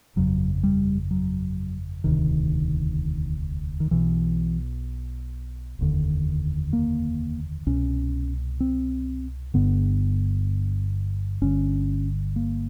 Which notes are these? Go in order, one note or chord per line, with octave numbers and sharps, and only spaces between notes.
G1 F2 C#3 F#3
G3
F#3
E1 D2 C3 D#3
D#3
B1 B2 E3
F1 D#2 D3
A#3
C2 B2 C#4
C4
G1 G2 D3 B3
G1 G2 D3 C#4
A#3